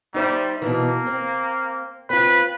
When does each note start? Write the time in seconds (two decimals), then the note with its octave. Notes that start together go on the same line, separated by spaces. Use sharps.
0.14 G3 D#4 C5 E5
0.62 B2 E3 A#3
1.07 C4
2.10 C4 F4 B4